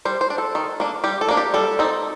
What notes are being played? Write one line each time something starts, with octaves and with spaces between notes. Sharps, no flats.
G3 C5
C5
D4
A4
D#3
A#3 D4
G3 G4
A4
A#3 D4
G4
G3 A4
C4 D#4